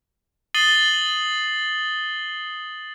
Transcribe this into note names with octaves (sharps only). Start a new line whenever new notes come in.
D#6 A6 C7 D#7 F#7 G7